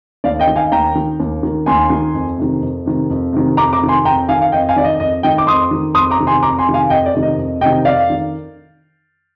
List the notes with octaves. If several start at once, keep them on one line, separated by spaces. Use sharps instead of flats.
D#2 D5 F5
D#5 G5
D#3
F5 G#5
D#2 G5 A#5
D#3
D#2
D#3
D#2 G#5 C6
D#3
F2
C3 D#3
F2
C3 D#3
F2
C3 D#3
F2 A#5 D6
A#5 D6
C3 D#3
G#5 C6
F2 G5 A#5
D#3 F5 G#5
F5
F2 D#5 G5
F5 G#5
D#3 D5
D#5
F2 D#5
D#3 D#5 G5
D6
F2 C6 D#6
D#3
F2 C6 D#6
A#5 D6
C3 D#3
G#5 C6
F2 A#5 D6
G#5 C6
C3 D#3
F5 G#5
F2 D#5 G5
D5
C3 D#3
D#5
F2
C3 D#3 D#5 G5
F2 D5 F5
D#3